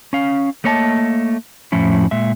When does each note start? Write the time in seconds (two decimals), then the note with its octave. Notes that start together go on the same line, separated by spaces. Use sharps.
0.13 C#4 F5
0.64 A3 A#3 C#5 D#5 G#5 A5
1.72 F2 A2 F3 C#4 E4
2.11 A#2 G#3 E5